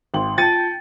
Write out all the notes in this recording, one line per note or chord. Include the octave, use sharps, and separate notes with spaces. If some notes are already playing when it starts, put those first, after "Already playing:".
G#1 G5 C6 F#7
F4 G5 A5 A6 C#7 D#7